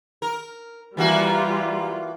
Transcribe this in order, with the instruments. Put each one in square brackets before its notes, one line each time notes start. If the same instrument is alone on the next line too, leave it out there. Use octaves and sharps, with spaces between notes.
[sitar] A#4
[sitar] E3 A#3 F#4 [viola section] G3 F4